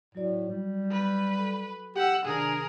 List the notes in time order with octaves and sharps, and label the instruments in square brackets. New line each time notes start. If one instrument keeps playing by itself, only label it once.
[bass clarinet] A2 [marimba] F#3 F#4 D5
[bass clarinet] G3
[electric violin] B4
[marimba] A4
[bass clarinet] G4 [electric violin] F#5 E6
[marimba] C3 D#3 [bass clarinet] D4 [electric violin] G#4 A#4